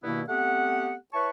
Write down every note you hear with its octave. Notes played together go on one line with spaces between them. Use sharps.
G2 B2 D#3 A#3 B3 E4
A3 B3 C4 G4 F#5
E4 B4 C#5 A5 C#6